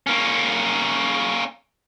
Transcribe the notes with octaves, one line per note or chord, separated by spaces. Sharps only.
A#3 C#4